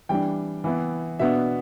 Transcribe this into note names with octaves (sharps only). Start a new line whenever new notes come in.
E3 G3 D4 G5
E3 B3 E4
B2 B3 D4 E5